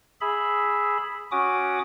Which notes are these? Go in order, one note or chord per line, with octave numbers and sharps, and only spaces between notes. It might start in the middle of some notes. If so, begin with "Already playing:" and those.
G#4 E5 B5
C#4 F#4 D6 D#6